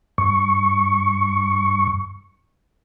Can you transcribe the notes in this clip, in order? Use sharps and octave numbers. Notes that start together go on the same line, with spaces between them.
G2 C#6